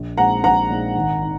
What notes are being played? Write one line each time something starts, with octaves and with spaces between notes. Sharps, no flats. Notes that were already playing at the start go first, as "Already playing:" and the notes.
Already playing: A#1
A#2 G#3 C4 D#4 F#5 A#5
A#1 F#5 A#5
A#2 G#3 C4 D#4
G#1
D#3